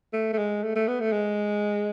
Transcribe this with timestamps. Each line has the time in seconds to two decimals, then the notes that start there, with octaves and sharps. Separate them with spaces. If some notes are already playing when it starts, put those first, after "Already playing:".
0.13 A3
0.33 A3
0.38 G#3
0.63 A3
0.76 A3
0.88 B3
1.00 A3
1.12 G#3